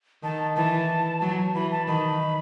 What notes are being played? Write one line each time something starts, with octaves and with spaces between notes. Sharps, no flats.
D#3 A5
E3 A5
F#3
E3 B5
A5
D#3 B5